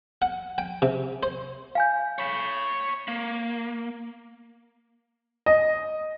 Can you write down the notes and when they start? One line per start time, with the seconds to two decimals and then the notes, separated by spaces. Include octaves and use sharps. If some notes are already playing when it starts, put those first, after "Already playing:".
0.22 F#5
0.58 G5
0.82 C3
1.23 C5
1.75 F5 G#5 G6
2.19 C#5 B5
3.08 A#3
5.46 D#5